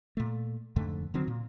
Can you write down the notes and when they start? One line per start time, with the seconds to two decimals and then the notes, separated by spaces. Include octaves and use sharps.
0.17 A#2 A3
0.76 F2 G#2 D3 A3
1.14 D3 D#3 F#3 C4
1.28 A#2